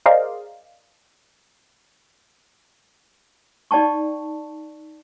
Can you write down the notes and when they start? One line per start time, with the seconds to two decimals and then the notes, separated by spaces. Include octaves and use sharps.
0.06 G#4 A#4 C5 D5 D#5 F5
3.71 D#4 D5 G5 A5 C#6